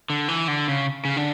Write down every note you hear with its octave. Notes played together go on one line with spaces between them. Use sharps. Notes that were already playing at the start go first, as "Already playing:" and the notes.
D3
E3
D3
C#3
C#3
D3